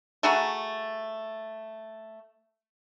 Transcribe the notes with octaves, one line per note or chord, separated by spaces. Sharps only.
A3 F#4 G#4 A#5